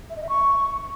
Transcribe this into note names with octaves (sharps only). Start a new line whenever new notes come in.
E5
D#5
E5
C#6